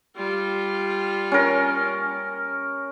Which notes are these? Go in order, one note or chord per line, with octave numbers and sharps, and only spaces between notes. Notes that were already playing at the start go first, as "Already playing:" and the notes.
G3 F4
C#4 A#4